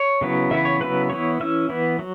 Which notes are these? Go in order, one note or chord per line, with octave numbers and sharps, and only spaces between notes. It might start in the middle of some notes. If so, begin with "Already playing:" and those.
Already playing: C#5
C#3 F#3 B3 E4
C#3 E3 B3 E4 E5
C#5
C#3 F#3 B3 E4 B4
E3 B3 E4 C#5
E3 C#4 E4 E5
E3 B3 E4
F#3